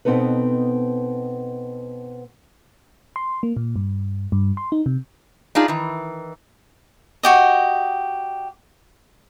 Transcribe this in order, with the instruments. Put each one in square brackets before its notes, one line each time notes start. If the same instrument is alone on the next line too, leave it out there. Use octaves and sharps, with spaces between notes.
[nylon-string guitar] B2 B3 C4 D#4 A4 B4
[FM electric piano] C6
A#3
A#2
G2
G2
C6
D#4
C3
[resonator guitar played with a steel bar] D4 D#4 F4 G#4
D#3 E3
[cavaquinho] F#4 G4 D#5